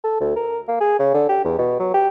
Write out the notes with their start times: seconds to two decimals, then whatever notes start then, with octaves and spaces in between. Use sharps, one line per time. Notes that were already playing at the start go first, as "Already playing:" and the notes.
0.04 A4
0.20 D2
0.36 A#4
0.68 A#3
0.81 G#4
0.99 C#3
1.14 D3
1.29 G4
1.44 E2
1.58 B2
1.80 F#3
1.94 G4